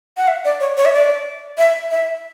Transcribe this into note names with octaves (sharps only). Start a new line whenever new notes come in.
F#5
E5
D5
C#5
C#5
E5
D5
E5
E5